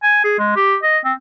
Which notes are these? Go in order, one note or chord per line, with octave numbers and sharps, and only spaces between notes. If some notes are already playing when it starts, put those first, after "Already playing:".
G#5
G#4
G#3
G4
D#5
C4